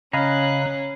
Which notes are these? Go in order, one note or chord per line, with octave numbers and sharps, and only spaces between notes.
C#3 C#4 G#4 D#5 F5 A#5 B5 F#6